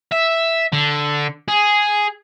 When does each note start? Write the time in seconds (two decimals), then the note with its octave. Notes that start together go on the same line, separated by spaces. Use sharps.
0.12 E5
0.73 D3
1.48 G#4